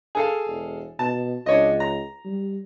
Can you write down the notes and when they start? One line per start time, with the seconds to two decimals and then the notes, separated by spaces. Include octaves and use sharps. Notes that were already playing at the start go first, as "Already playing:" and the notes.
0.15 G#4 A4 F5
0.46 E1
0.99 B2 A5
1.46 C#2 D4 C#5 D#5
1.80 A#5
2.25 G3